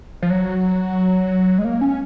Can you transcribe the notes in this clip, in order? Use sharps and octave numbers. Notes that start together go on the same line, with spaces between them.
F3
F#3
G#3
A#3
C#4